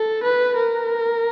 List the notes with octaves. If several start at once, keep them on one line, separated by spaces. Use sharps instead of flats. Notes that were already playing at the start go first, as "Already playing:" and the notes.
Already playing: A4
B4
A#4